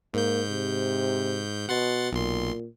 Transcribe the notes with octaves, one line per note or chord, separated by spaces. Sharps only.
G#2 A#3 G6
C3
B2 F#5 C6 A6
B1 A#2 C6